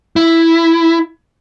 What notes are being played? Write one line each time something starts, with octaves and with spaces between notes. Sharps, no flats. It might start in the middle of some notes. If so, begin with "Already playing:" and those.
E4